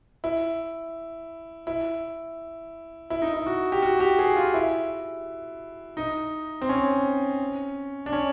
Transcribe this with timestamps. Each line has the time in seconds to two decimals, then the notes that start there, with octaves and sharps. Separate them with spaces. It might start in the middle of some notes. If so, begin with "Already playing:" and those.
0.24 E4
1.67 E4
3.10 E4
3.22 D#4
3.33 E4
3.47 F#4
3.72 G4
3.82 F#4
4.00 G4
4.19 G#4
4.36 F4
4.54 E4
5.97 D#4
6.62 C4
6.69 C#4
8.06 D4
8.13 C#4